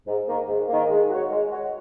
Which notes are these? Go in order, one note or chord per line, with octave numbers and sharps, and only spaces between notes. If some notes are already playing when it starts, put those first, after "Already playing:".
G#2
D#3 A#3
G#2
D#3 A#3
G#3
F#4 C#5
G#3
F#4 C#5